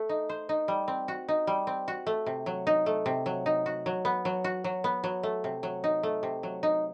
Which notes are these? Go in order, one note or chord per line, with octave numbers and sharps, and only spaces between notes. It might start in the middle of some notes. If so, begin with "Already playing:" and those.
Already playing: A3 A4
D#4
C5
D#4
G3
C4
F#4
D#4
G3
C4
F#4
A3
C3
F#3
D#4
A3
C3
F#3
D#4
F#4
F#3
B3
F#3
F#4
F#3
B3
F#3
A3
C3
F#3
D#4
A3
C3
F#3
D#4